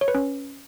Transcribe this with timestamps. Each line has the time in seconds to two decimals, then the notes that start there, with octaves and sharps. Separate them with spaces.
0.01 C#5
0.08 B4
0.15 C#4